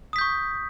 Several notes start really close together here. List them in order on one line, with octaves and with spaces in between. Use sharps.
D#6 B6 G6 C#6